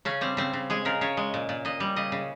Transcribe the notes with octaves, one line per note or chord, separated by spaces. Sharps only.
C#3 C#4
G3 C4
C#3 C4
C#3
G#3 G#4
C#3 A#4
C#3 C#5
G#3
A#2
A#2
A#2 D#5
G3
C#3 D#5
C#3